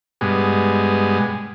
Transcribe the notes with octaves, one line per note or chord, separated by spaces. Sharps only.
G2 B2 G#3